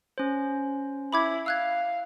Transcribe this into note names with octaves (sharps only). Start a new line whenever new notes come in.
C#4 C5
E4 B5 D6 G#6
F5 E6 F#6 G#6